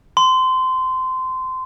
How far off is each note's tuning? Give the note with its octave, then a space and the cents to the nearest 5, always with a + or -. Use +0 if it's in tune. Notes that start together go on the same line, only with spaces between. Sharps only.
C6 -20